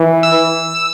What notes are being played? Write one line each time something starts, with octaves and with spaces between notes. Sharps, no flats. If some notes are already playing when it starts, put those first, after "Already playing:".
Already playing: E3
E6